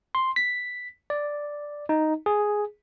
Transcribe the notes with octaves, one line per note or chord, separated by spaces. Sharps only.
C6
B6
D5
D#4
G#4